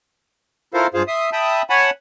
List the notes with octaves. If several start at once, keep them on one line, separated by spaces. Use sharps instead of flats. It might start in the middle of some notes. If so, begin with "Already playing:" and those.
E4 F4 A4 A#4 C5 F5
G2 F4 G#4 C5 F5
E5 C6 D#6
E5 G5 A5 B5 D#6
C#5 F#5 G#5 A5 B5